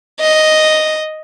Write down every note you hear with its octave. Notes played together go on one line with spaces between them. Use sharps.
D#5